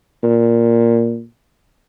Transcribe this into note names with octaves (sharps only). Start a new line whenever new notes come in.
A#2